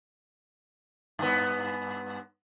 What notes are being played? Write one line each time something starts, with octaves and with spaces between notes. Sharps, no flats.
G2 B3